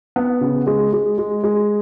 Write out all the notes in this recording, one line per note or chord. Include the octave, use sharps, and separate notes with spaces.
B3
C#3
G#3
G#3
G#3
G#3